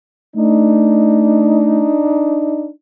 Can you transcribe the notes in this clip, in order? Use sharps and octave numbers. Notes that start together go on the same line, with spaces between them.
A3 D4 D#4